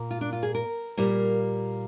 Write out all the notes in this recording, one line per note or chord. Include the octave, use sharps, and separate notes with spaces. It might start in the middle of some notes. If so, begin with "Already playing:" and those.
Already playing: A#2 A#3
F4
D4
F4
G#4
A#4
A#2 G3 A#3